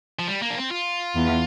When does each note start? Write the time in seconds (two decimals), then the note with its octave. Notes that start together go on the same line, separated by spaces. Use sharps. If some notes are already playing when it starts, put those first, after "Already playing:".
0.19 F3
0.28 G3
0.42 A#3
0.50 D4
0.57 C4
0.71 F4
1.16 E2